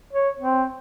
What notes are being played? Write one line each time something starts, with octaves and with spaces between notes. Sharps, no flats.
C#5
C4